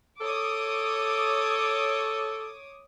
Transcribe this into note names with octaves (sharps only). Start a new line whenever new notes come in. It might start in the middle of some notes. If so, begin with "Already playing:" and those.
A4 C#5 D6 D#6